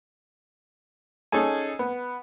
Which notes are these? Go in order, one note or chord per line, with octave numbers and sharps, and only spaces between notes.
C#4 D#4 G#4 A4 G#5
B3